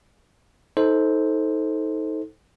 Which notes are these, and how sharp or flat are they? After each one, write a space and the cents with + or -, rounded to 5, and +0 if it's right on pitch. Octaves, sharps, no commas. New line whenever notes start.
D#4 +30 A4 -5 C5 +0